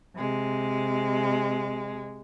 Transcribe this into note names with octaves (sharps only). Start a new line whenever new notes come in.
C3 G#3